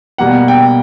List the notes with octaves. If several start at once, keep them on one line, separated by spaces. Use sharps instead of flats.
B2 G3 A#3 F#5
G5